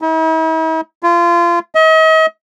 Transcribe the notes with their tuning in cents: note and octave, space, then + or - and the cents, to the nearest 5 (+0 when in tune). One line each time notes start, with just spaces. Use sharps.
E4 -45
F4 -25
D#5 +40